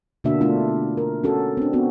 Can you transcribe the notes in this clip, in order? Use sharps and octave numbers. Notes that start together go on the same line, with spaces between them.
B2 D3 A#3 D4 F#4 E5
A3 D4 E4 F4
A#4
C#4 F#4 A4
C4 D4
B3 C4 F#4